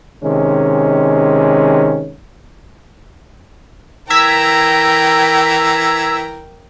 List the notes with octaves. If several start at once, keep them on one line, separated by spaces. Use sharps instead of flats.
C3 D#3 G#3 C#4
E3 A#4 G5 A#5 E6 G#6 B6